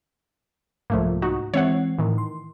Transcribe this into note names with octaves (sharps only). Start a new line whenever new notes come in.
C2 G#2 F3 A3 A#3
D#4 F#4
E3 G#3 C4 C#5 E5 F#5
A2 D#3 E3
C6